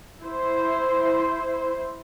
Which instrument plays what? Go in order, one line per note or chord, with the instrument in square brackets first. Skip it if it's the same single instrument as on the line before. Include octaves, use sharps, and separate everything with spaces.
[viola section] E4 C5